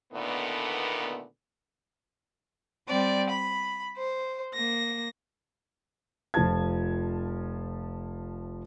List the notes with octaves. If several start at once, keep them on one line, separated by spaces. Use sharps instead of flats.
A#2 D3 D#3 A3 B3
G3 C4 D5
B5
C5
A#3 A#6
F1 F3 F4 A5 G#6